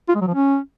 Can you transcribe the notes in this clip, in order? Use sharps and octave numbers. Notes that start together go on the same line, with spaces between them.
F4
G#3
F#3
F3
C#4